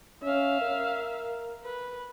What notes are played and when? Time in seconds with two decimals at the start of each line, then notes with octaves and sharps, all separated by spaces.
0.23 C#4 E5 F5
0.62 A#4
1.64 B4